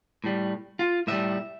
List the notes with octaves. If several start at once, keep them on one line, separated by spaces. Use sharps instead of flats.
A2 G3
F4
A2 G3 E5